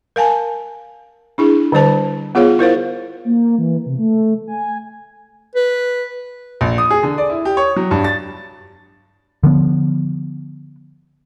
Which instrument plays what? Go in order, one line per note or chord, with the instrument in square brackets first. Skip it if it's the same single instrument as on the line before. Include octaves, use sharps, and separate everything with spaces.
[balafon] A#4 F5 G#5 A5
D4 E4 G#4
D3 G3 C5 A5
B3 F4 G#4 C#5 F5
E4 A#4 C5 F5
[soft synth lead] A#3
E3
C3
A3
G#5
[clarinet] B4
[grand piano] A#1
D#6
G#4
D3
D5
E4
G4
C#5
F#3
G2
A6
[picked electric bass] D3 F3 B3